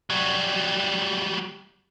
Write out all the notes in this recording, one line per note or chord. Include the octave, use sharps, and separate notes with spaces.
F#3 G3